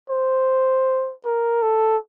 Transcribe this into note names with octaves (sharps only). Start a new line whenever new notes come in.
C5
A#4
A4